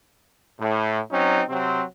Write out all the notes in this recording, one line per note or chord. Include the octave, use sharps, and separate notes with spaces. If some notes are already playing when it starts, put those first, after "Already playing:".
A2
F#3 C4 C#4 D#4
C3 F#3 C4